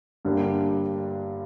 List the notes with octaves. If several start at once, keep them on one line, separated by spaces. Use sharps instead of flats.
G1 G2 D3 G3 A#3